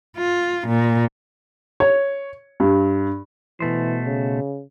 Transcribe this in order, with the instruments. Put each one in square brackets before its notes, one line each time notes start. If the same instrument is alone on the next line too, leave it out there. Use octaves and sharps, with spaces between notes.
[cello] F4
A#2
[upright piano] C#5
G2
[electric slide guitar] B2 A3 C5 [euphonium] E3
[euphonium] C#3